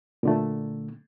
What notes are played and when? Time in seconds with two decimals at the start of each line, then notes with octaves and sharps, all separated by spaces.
0.23 A#2 D3 A3